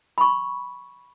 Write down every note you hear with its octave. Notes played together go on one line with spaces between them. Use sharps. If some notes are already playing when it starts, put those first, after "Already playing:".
B5 C#6